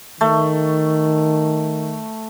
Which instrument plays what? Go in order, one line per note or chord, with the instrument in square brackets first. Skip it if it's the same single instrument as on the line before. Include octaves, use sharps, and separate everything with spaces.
[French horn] D#3 [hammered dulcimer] A3